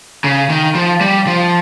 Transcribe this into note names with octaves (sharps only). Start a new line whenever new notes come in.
C#3
D#3
F3
G3
F3